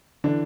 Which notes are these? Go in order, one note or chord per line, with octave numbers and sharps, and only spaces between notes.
D3 E3 D4